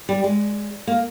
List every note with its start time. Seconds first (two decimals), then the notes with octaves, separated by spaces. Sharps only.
0.09 G3
0.24 G#3
0.87 A#3